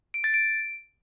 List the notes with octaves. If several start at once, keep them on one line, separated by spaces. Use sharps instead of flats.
D7
A6
D7